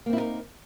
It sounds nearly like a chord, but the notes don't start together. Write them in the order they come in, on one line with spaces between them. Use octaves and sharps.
A#3 C4 E4 D#4 A#4